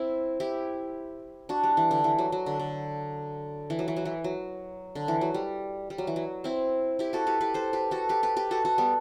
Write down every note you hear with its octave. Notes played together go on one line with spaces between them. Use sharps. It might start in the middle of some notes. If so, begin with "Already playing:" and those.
Already playing: C4 E4
E4 G4
D4 F#4
G3
E3
D3
E3
F#3
F#3
D3
D3
E3
F#3
E3
F#3
E3
F#3
D3
E3
F#3
G3
G3
F#3
E3
F#3
C4 E4
E4 G4
F#4 A4
G4 B4
G4 B4
A4 C5
G4 B4
F#4 A4
G4 B4
G4 B4
G4 B4
F#4 A4
F#4 A4
G3 B3